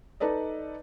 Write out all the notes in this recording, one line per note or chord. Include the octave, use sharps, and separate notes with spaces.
D#4 A4 B4 D5 D#5